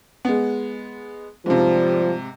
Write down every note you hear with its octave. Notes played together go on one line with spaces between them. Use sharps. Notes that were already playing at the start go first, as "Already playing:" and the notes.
G#3 B3
G#2 C3 F3 G3